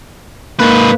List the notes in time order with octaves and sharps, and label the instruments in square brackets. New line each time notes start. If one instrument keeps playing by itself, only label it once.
[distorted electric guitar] G#2 B4 [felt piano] A#3